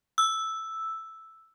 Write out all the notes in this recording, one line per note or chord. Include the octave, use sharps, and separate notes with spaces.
E6